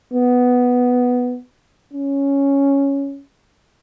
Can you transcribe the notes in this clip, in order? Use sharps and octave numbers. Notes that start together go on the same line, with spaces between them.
B3
C#4